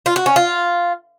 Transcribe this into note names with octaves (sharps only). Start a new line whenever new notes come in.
F4
F#4
C#4
F4